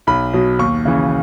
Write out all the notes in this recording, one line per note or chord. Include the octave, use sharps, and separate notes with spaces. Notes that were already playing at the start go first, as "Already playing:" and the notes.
B1 B5
B2 F#3
D#2 C#6
C#3 E3